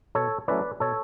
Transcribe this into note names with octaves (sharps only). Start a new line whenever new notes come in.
B2 A4 C#5
F#3 A3 C#4 E4 B4 D5
B2 A4 C#5